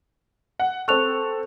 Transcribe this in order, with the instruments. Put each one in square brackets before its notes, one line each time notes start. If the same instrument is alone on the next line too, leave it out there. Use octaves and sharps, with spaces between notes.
[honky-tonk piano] F#5
[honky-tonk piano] C4 A4 [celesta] C#6 F#6 F7